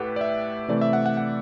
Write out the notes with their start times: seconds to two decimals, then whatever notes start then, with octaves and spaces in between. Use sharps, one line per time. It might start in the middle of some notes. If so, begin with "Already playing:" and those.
Already playing: A2 G4 A4 B4 F#5
0.16 D5
0.21 E5
0.68 C3 E3 A3 D5
0.81 E5
0.93 F#5
1.06 F#5
1.17 F#5